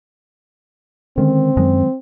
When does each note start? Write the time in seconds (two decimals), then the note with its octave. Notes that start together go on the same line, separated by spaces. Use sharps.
1.18 D3 D#3 G#3 C4 C#4
1.57 F#2 D#3 F#3 G#3